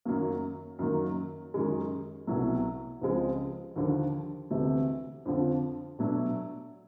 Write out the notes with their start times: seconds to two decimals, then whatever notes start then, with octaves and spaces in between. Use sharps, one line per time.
0.05 F#2 D#3 F#3 A#3
0.79 F#2 D#3 F#3 A#3
1.54 F#2 D#3 G#3
2.27 C2 B2 F#3 A3
3.01 C#2 C#3 F3 G#3 C4
3.76 D#2 D3 F3
4.51 D2 C3 E3 A3
5.25 F2 D3 F3
5.99 B2 F#3 A3 D4